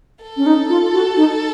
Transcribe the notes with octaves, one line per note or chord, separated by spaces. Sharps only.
A4
C#4
D#4
F4
F#4
D#4